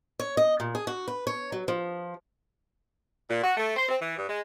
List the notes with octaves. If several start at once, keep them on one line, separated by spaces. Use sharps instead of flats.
C#5
D#5
A#2
G#4
F#4
B4
C#5
F#3
F3
A#2
F#4
A3
C5
C4
E3
G2
G#3